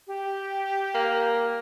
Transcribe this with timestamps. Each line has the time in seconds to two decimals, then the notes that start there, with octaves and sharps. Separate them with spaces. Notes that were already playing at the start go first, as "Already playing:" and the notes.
0.07 G4
0.94 A#3